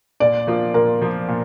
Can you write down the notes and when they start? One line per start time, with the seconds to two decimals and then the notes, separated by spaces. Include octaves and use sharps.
0.20 A#2 D5
0.47 F3 A#3 F4
0.74 A#2 A#4
1.01 F3 A#3 F4
1.28 A#2